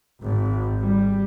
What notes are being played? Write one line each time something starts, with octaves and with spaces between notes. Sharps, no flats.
G#1
G3